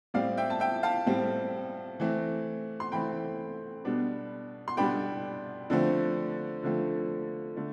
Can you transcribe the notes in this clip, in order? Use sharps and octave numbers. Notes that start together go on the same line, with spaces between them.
A2 G3 C4 D5 F5
E5 G5
A5
E5 G5
F5 A5
A2 G3 C4
E3 A3 C4
C6
E3 A3 C4 G5 B5
B2 G3 B3 D4
C6
B2 G3 B3 D4 G5 B5
D3 F3 A3 C4
D3 F3 A3 C4
D3 A3